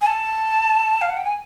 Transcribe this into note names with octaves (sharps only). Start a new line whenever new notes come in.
G#5
A5
F5
F#5
G5
G#5